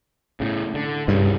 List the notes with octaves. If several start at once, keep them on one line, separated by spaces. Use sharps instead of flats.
A2 C#3
D3
C2 G2 C#3